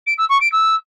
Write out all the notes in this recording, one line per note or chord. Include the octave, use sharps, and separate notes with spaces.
D7
E6
C#6
D7
E6